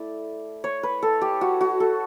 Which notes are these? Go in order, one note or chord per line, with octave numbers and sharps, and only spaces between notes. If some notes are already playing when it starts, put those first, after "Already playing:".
Already playing: A3 E4 D5
C#5
B4
A4
G4
F#4
F#4
A4